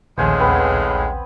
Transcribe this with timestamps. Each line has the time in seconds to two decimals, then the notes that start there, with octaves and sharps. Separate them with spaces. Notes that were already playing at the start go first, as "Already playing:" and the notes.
0.18 A#1 D#2 A2 C#3 G#3 C5 F#5 G#5
0.40 B3 C4 B4